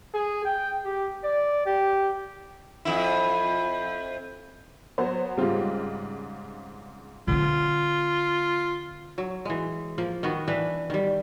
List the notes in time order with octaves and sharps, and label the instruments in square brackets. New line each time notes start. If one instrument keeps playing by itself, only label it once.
[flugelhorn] G#4
G5
G4
D5
G4
[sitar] F2 E4
[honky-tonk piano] F#3 B3 C5
[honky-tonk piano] G#2 C#3 [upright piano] G3 C4 F4
[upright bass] D3 C4 [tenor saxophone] F4
[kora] F#3
E3 G#3
F3 A#3
D#3 B3 F#4
E3 D4 B4
D#3 G3